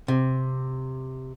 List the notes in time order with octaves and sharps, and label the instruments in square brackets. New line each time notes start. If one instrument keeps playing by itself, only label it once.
[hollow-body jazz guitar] C3